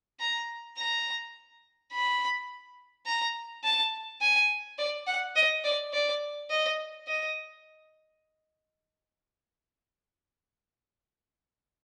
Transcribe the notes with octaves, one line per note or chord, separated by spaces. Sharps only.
A#5
A#5
B5
A#5
A5
G#5
D5
F#5
D#5
D5
D5
D#5
D#5